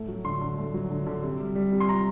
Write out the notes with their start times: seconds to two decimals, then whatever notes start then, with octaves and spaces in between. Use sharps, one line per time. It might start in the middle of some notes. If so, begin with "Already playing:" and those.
Already playing: A2 A3
0.08 F#3
0.24 D3 C6
0.41 D3
0.58 A3
0.74 F#3
0.90 D3
1.07 D3
1.23 C3
1.40 G3
1.55 G3
1.72 C3
1.80 C6
1.89 C3 A#5